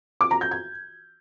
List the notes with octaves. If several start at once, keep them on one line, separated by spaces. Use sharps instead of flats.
D6
A#5
G6
G#6